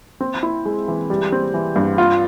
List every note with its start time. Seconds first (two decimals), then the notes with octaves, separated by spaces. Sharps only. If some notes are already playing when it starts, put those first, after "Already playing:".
0.21 C4
0.43 E4
0.65 G#3
0.88 E3
1.10 G3
1.32 C4
1.54 E3
1.76 G2
1.98 F4